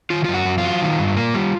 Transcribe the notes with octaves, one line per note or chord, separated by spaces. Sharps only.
D#3 F4
F#2 F4
F#4
F#2
F4
F#3
D#3
G2
A#3
G3